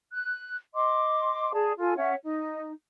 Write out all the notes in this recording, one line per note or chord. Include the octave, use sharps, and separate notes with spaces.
F#6
D#5 C6 D6
G#4 D5 A5
F4 A4 G#5
C#4 C#5 E5 F#5
D#4